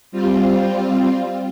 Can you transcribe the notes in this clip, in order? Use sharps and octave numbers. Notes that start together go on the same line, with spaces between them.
G3 C4 F4